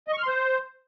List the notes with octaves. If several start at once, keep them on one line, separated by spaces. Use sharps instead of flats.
D#5
C#6
F6
C6
C5